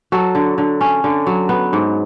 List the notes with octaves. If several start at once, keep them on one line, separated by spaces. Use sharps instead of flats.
F#3 F#4 A4
D3
D3
C#4
D3
F#3
B3
G#2